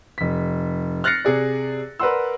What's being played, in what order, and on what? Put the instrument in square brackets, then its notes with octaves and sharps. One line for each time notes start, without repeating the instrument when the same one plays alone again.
[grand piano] F1 B6
F6 F#6 A6 A#6 C7 C#7
C3 G#4 D5
A#4 B4 D5 F#5 C6 E6